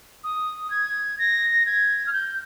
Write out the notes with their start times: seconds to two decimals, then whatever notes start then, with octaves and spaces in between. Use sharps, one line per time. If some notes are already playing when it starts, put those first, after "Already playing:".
0.24 D#6
0.70 G#6
1.19 A#6
1.66 G#6
2.06 F6
2.13 G6